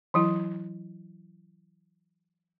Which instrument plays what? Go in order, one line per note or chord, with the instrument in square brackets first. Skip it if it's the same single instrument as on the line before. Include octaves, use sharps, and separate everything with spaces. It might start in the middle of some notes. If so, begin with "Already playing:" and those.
[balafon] E3 F#3 E4